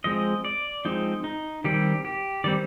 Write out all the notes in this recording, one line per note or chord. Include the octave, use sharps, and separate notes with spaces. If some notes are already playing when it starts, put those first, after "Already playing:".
F3 G#3 C4 D#5
D5
F3 G#3 C4 D#4
D#4
D#3 G3 C4 G4
G4
D#3 G3 C4 D5